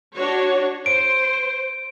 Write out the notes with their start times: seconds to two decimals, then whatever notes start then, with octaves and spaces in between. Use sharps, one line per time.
0.17 D4 F#4 C#5
0.86 C5 D7